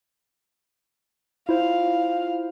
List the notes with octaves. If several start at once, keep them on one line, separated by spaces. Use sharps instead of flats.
E4 F4 C5 F5